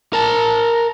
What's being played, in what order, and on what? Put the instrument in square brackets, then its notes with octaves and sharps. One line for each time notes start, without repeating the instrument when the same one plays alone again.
[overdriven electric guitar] A#4 A5